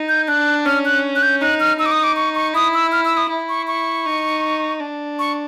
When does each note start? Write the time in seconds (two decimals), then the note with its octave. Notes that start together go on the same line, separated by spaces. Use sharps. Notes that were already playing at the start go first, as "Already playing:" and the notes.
Already playing: D#4
0.09 G6
0.28 D4 F#6
0.66 C#4 F6
0.85 F#6
1.15 F#6
1.22 G6
1.42 D#4 F#6
1.60 F6
1.79 D#4 E6
1.86 D6
1.91 D#6
2.04 D6
2.16 C#6
2.35 C#6
2.54 E4 D#6
2.74 E6
2.92 F6
3.05 E6
3.17 D#6
3.30 E4
3.49 C#6
3.67 C#6
4.06 D#4
4.81 D4
5.19 C#6